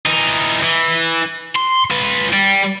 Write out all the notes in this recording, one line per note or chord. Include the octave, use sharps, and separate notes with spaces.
E3 D#4
E3
C6
F4 B4
G3